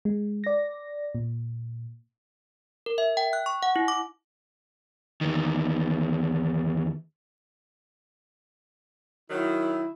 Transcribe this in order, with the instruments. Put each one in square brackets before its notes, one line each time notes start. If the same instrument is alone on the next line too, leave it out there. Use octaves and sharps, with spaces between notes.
[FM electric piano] G#3
D5 A#6
A#2
[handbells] A#4
E5
G5
F#6
C#6
F#5
E4
D6
[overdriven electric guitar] E2 D#3
[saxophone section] D#3 F#3 [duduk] E4